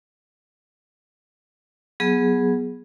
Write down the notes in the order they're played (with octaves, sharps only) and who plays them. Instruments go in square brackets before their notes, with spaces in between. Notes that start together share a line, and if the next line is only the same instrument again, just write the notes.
[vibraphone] F#3 B3 G#4